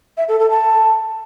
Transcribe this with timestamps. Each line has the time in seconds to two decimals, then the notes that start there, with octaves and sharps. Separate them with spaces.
0.17 E5
0.28 A4
0.39 A4
0.51 A5